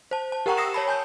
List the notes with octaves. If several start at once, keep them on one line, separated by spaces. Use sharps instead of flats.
C5 A5
A5
G4 A#4 F#5 G5 A#5 C#6
D#6 E6 A#6 C7 C#7 E7
C#5 A5 B5
G#5 A5 G6